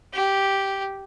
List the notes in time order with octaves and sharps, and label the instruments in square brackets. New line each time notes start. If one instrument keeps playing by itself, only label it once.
[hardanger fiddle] G4